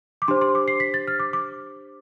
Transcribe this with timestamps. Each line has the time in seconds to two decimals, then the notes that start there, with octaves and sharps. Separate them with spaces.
0.22 D6
0.28 D4 G4 C5 C6
0.41 C6
0.55 D6
0.68 C7
0.80 B6
0.94 A6
1.08 F6
1.20 D6
1.33 D6